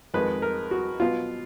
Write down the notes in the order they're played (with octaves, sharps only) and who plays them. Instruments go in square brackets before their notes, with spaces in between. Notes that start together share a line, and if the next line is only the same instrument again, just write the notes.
[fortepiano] F2 D#3 G#3 B4
A#4
F#4
B2 F#3 B3 F4